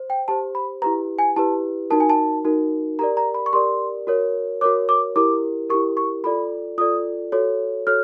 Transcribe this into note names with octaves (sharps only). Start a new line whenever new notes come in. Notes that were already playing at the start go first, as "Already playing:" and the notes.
Already playing: C5
G5
G4 C5 A5
B5
E4 G4 B4 A#5
G#5
E4 G4 B4 A5
D#4 F#4 A#4 A5
G#5
A5
D#4 F#4 A#4
G4 A#4 D5 A#5
A#5
B5
C#6
G4 A#4 D5 C6
F#4 A#4 C#5
F#4 A#4 C#5 D6
D6
E4 G4 A#4 D6
E4 G4 A#4 C#6
C#6
F4 A4 D5 B5
F4 A4 D5 D#6
F#4 A4 C#5
F#4 A4 C#5 F6